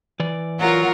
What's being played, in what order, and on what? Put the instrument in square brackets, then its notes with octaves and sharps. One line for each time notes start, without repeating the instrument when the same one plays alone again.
[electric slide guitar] E3 D5
[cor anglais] F#3 [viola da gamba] F4 [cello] A#4 F#5